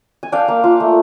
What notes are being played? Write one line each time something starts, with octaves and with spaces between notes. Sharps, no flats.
G#5
D4 F5 G5
A#3
F4
A3